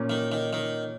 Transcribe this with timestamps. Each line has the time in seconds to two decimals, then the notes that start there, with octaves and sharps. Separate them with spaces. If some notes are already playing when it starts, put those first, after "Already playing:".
Already playing: A#2 A#3 C#4
0.10 D#3
0.32 D#3
0.53 D#3